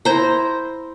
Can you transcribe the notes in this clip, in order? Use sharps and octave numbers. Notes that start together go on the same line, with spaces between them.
E4 C5 A#5